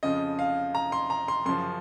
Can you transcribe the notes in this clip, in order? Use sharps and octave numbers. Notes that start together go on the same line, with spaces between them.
F2 C#3 F3 D#5
F5
A#5
C6
A#5
C6
F#2 C#3 F3 C6